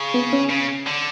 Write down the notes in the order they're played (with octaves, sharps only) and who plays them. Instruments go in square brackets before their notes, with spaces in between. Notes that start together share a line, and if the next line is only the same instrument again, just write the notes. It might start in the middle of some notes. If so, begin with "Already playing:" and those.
Already playing: [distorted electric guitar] C#3
[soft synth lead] B3
C#4
[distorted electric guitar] C#3
D3